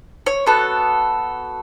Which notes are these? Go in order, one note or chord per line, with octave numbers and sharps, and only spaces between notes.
C#5
B3 F#4 A4